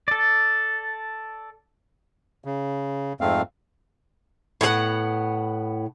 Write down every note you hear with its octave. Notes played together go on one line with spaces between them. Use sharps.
A4 D5
C#3
F2 G#2 A3 C4 F5
A2 B3 G#4 F#5